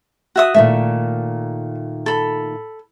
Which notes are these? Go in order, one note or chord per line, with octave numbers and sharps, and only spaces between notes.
F#4 E5 D#6
A#2 D#3 A3 E5
A4 B5